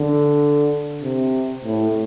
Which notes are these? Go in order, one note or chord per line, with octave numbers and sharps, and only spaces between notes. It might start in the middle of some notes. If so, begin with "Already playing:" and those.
Already playing: D3
C3
A2